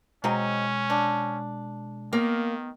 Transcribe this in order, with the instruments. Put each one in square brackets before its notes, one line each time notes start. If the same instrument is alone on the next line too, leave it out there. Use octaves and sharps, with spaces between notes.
[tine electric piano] B2 G#3 [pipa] F#3 C4 D#4 [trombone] C#4
[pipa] D4
[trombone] D#3 [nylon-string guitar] A#3 [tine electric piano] B3